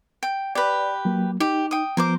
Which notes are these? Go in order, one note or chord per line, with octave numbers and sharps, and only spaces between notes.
G5
G4 B4 D5
F#3 A#3
D#4 G4
G5 D#6
F3 B3 A#4 C5 D6